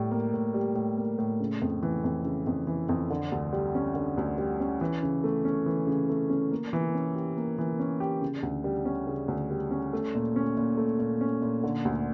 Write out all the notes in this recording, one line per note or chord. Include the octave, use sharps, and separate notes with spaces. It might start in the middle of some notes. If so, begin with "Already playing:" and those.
Already playing: A2 G3
A#3
A2
G3
A2
A#3
A2
C#3
F2
E3
F2
C#3
F2
E3
F2
D3
D2
G3
C#4
D3
D2
G3
C#4
E3
C#3
A3
C#4
E3
C#3
A3
C#4
A#3
E3
C#4
G4
A#3
E3
C#4
G4
C#3
D2
G3
C#4
C#3
D2
G3
C#4
A3
A#2
C#4
A#2
A3
A#2
C#4
A#2
D3
D2